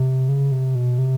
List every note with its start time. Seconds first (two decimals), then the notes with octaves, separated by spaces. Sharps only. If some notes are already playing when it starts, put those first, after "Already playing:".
Already playing: C3
0.29 C#3
0.52 C3
0.75 B2
0.98 C3